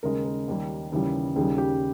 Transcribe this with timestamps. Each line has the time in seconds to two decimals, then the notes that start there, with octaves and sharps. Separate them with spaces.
0.03 D#2 C#3 G#3 A#4
0.25 A#4
0.48 D#2 D#3 G3
0.92 D#2 C#3 E3 G3
1.36 D#2 C#3 G3 G#4
1.58 G4